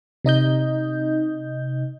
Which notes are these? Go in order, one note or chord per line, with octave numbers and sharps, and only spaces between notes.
C3 D#4 D#5 G6